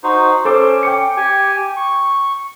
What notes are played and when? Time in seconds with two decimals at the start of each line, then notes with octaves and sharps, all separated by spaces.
0.04 D#4 F#4 C5
0.45 C#4 A4 C5 D6
0.83 G5 D6 C#7
1.17 G4 G#5
1.76 C#6